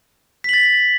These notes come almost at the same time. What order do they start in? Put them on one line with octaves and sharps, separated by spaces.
B6 F#7 A6